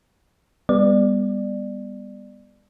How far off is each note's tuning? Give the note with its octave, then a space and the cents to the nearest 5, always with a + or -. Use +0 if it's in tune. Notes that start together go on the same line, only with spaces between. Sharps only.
G3 +35 B3 +0 D5 +20